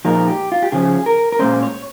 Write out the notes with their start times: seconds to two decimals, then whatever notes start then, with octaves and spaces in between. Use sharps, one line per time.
0.05 A#2 F3 G#3 D#4 A#4
0.28 G4
0.52 F4
0.62 G4
0.72 C#3 F3 C#4 G#4
1.06 A#4
1.32 A#4
1.39 A#2 G#3 C#4 C5
1.63 C#5